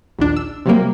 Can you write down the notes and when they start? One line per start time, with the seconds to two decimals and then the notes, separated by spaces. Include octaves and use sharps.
0.19 A#1 D#2 D4
0.36 E6
0.66 C3 F#3 G3 A#3